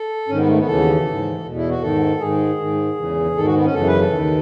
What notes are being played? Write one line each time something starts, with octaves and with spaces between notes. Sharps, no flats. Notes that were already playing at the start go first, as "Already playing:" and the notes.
Already playing: A4
G#2 D#3 C#4
B3
A3
B3
D#2 C#3 E3 A4
G#2 E3
E2 B2
E4
F#4
G#2 D#3 A4
G#2 D#3 G#4
G#2 D#3
E2 C#3 E3
G#2 D#3 A4
F#4
B3
C#4
F#2 C#3 E3 A4
B4
A4
D#2 D#3